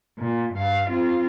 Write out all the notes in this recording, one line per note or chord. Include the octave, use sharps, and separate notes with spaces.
A#2
G2 F5
C4 F4